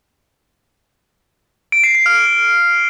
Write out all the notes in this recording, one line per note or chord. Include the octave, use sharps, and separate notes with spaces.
D7
C7
C7
F6